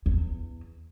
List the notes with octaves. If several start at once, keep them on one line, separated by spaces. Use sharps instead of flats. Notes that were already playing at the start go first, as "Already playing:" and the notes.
E2